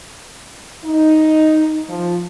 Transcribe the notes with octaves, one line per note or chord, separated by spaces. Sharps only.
D#4
F3